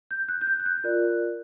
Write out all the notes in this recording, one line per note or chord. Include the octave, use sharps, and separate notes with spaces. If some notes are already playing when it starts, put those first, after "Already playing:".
G6
F#6
G6
F#6
G6
F#6
F4 A#4 D5